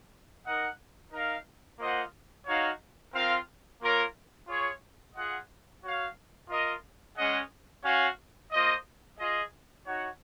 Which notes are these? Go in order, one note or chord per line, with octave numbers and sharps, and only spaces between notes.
D#4 A#4 D#5 F#5
D#4 A#4 F5
A#3 F4 C5 D#5 F#5
D#4 F#4 C#5 F5
C4 F4 A#4 F5
A#3 F4 A#4 C#5
F4 G#4 C#5
F4 G#4 D#5 F#5
F#4 C#5 F5
F4 A#4 D#5
G#3 C#4 G#4 D#5 F#5
C#4 F#4 C#5 F5
A#3 F4 C5 D#5
F4 G#4 D#5
D#4 F#4 C#5 F#5